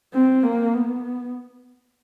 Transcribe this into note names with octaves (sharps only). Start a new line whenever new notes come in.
C4
A#3
B3